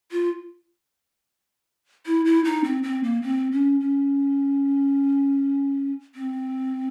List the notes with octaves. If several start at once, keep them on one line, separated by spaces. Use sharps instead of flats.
F4
E4
E4
D#4
C4
C4
A#3
C4
C#4
C#4
C4